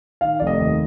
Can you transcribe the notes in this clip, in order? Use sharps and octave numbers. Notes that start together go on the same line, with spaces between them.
D#3 F5
F1 D5
D#5
D#2